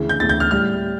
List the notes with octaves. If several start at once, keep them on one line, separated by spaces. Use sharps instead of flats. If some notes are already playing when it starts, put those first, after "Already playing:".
Already playing: D2 C#3 E3
G6
D2 C#3 E3 A6
G6
F6
A2 G3 F6